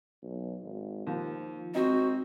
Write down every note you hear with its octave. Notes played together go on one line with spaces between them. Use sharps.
B1
G#1
D#2 F3
G#1 C4 D#4 F#4